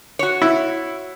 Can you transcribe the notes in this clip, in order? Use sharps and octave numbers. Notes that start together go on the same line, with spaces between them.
F#4 C#5
E4